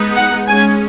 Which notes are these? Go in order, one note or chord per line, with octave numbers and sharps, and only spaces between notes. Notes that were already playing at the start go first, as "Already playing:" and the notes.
Already playing: G#3 B3 D#4
F#5
G#3 C#4 G#5